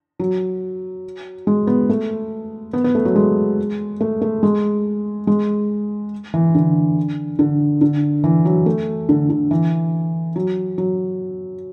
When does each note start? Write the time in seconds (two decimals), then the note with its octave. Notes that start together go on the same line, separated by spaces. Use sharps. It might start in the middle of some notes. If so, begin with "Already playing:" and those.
0.20 F#3
1.47 G#3
1.67 B3
1.89 A3
2.73 B3
2.84 B3
2.95 A3
3.05 F#3
3.16 G#3
4.01 A3
4.22 A3
4.43 G#3
5.27 G#3
6.34 E3
6.55 D3
7.39 D3
7.81 D3
8.24 E3
8.45 F#3
8.66 A3
9.09 D3
9.30 D3
9.51 E3
10.36 F#3
10.78 F#3